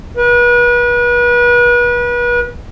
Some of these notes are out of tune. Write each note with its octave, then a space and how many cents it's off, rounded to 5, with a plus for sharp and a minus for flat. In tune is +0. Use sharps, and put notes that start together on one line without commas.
B4 -35